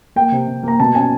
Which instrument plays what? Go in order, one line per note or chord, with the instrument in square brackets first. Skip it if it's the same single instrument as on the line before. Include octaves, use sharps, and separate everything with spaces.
[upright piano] A#3 G5
C3
C3
A#3 A#5
B2 A5
C#4 G#5